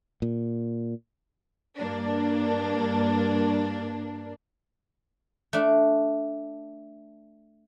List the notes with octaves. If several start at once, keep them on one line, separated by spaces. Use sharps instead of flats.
A#2
G2 A#3 D4
A3 D4